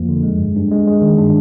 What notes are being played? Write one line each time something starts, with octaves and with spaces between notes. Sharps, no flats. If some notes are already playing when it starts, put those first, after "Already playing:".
Already playing: F2 F3 A#3
D3
G#3
G2
G2
G#3
G#3
D#3
D4